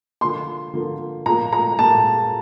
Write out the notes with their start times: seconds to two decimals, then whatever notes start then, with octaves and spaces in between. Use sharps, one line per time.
0.21 D3 F3 A#3 C6
0.74 D3 F3 A#3
1.26 A#2 F3 A#3 A#5
1.53 A#5
1.79 A#2 F3 A#3 A5